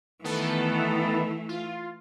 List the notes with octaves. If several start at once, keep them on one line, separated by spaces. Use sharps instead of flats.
D#3 E3 A3 B3 A4
F4